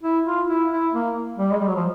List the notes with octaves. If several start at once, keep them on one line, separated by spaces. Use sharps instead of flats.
E4
F4
E4
E4
A#3
G3
G#3
G3
F#3
F3